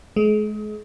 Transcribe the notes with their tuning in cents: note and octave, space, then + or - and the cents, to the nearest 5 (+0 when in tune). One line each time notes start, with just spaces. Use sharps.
G#3 +35